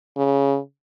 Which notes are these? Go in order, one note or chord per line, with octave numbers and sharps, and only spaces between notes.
C#3